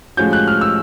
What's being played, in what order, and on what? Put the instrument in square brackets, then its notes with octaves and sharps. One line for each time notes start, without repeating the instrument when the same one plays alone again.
[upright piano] A2 F3 G#3 C#4 F#4 [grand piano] G6
[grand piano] F#6
F6
E6